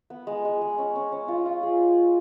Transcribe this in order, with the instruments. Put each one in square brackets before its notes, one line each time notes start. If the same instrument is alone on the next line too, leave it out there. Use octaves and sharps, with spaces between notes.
[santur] B3
G#3
G#3
G#3
C#4
C#4
C#4
F4
F4
G#4